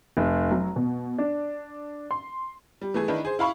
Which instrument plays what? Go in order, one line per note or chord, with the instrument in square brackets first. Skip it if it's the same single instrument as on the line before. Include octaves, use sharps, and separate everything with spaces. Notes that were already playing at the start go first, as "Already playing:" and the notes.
[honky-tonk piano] F1
F#3
B2
D4
C6
G3
E3 A3 G#4
D#3 D4 E4 B4
G#4 C5
E4 F5 B5 C#6